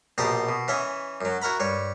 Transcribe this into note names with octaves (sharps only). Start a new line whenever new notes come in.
A#1 B2 G4 A5 A#5 C6
B2
E3 C#4 D#5 E5
F#2 F#3
E4 F#4 A#4 A#5 B5
G2 C#5